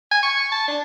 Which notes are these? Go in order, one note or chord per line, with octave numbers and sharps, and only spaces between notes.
G#5
C#6
A5
D4